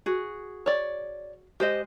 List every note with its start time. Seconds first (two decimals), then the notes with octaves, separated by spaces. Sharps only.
0.06 F#4 G#4
0.66 C#5 D5
1.60 G#3 G4 C5 D#5